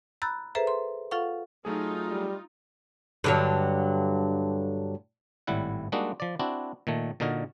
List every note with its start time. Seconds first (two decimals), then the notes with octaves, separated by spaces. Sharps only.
0.22 A#5 B5 E6 F#6 G6 A6
0.55 G#4 A4 B4 C5 E5 A#5
0.67 C6
1.11 F4 A4 F5 F#5 C#6
1.65 F#3 A3 D#4 F4 G#4
2.11 G3
3.24 G2 D3 F#3
5.47 G#1 A2 G3 E4 F#5
5.92 G3 G#3 A#3 D4 D#4 F#4
6.20 F3 D5
6.39 C4 D4 E4 F#4
6.87 A#2 D#3 A3
7.20 A#2 D3 D#4 F#4 A#4